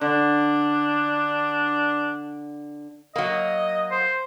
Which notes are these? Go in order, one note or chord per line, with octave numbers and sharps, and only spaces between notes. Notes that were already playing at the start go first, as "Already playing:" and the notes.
D3 D4
F#3 A#3 D#5
C5